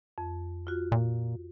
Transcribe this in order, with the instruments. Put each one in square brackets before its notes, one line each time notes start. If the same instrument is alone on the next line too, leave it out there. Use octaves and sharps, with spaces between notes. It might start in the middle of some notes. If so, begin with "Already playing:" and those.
[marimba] F2
F4 F#4
[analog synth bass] A#2